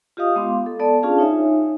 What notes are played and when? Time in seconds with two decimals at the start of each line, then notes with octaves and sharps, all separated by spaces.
0.17 F4 G4 D#5 F5 D#6
0.35 G#3 B3 F5 C6 D6
0.66 A4
0.79 B3 A4 D5 A5
1.03 C#4 D4 F4 G#4 F5 A5
1.18 D#4 C#5 E5 G#5